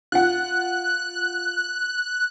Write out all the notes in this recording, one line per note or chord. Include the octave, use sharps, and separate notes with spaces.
F4 F#5 F#6